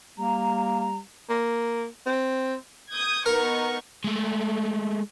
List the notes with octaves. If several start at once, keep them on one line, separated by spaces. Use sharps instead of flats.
G3 A#3 A#5
A#3
C4
D#6 G6 G#6
B3 D#4 A#4 C#6
G#3 A3